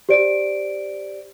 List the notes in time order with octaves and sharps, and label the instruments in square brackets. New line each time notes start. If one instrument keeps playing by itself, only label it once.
[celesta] G4 C5 D5 D7